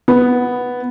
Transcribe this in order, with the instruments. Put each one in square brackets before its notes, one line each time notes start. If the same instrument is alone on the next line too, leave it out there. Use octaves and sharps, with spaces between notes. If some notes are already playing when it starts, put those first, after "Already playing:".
[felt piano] B3